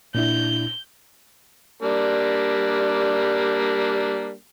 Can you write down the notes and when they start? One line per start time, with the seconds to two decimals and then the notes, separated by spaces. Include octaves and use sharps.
0.15 A#2 D4 E4 G6
1.82 G3 A#3 D4